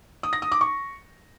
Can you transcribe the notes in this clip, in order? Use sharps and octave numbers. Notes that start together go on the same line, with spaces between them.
D#6
A#6
D#6
D6
C#6